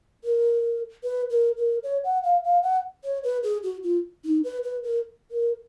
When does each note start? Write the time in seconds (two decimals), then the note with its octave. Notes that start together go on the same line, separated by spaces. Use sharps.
0.24 A#4
1.04 B4
1.30 A#4
1.57 A#4
1.84 C#5
2.04 F#5
2.24 F5
2.44 F5
2.63 F#5
3.04 C#5
3.24 B4
3.43 G#4
3.63 F#4
3.83 F4
4.25 D#4
4.44 B4
4.63 B4
4.84 A#4
5.31 A#4